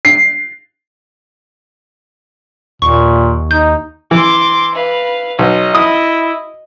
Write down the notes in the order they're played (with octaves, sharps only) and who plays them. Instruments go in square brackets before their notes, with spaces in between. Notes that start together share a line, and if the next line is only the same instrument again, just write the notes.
[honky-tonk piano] C7
[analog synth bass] D#2 [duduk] A#2 [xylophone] C#6
[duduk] D#4 [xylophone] G6
[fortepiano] E3 [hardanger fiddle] C6 D6
[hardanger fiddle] B4 F5
[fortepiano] B1 [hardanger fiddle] D#5
[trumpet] E4 [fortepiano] D#6